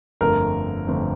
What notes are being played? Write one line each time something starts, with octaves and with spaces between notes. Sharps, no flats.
G1 F2 D3 A3 C4 A#4
G1 F2 D3 A3 C4